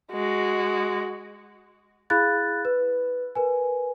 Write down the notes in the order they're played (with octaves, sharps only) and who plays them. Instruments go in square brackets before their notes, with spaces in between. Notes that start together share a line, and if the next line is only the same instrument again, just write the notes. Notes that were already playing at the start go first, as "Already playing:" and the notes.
[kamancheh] G#3 F#4
[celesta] E4 G#4 F5 B5 F#6 A6
B4
A#4 B4 G#5